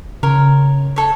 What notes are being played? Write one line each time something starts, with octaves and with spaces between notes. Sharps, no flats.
C#3 A#4 C#5
A4 C#5